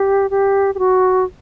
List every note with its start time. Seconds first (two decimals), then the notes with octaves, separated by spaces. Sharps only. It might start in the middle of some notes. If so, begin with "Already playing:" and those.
Already playing: G4
0.30 G4
0.75 G4
0.79 F#4